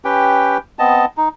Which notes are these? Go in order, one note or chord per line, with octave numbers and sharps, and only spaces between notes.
C#4 G4 B4 G5
B3 C4 D#5 A5
D#4